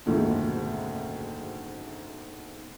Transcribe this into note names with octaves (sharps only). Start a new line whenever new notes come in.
F#1 D2 G#2 B2 D3 D#3